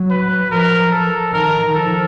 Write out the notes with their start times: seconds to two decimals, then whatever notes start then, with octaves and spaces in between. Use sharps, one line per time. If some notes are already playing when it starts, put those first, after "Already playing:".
Already playing: F#3
0.10 B4
0.51 F3 A#4
0.92 A4
1.33 D#3 A#4
1.75 F3 A4